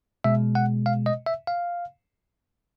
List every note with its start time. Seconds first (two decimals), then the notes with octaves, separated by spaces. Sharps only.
0.24 B2 G#3 E5
0.55 F#5
0.86 F5
1.06 D#5
1.26 E5
1.47 F5